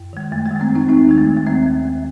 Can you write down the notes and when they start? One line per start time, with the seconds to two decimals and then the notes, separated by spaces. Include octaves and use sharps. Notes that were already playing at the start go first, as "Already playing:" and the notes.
Already playing: F#2
0.13 D#3 G#3
0.32 F#2 A3
0.45 G#3
0.51 D#3 A3
0.60 G#3 C4
0.70 F#2
0.75 C4 D#4
0.89 D#2 C4 D#4
1.09 D#3 G#3
1.18 A3
1.28 D#3
1.37 A3
1.46 D#2 G#3 C4
1.65 D#2
1.86 D#2